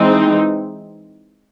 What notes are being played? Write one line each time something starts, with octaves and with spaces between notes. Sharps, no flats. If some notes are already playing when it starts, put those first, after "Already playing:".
Already playing: E3 G#3 C4 D#4